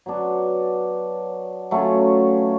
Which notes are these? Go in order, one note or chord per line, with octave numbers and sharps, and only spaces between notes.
F#3 B3 D4
F#3 A3 C#4 F4